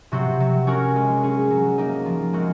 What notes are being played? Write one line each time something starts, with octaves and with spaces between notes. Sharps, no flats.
C3 F#3 C4 F#4
F#3
C#4 F#4 A#4 C#5
G#3
C#4 G#4
F#3
A#3 D#4
F3
G#3 C4 F#4 A#4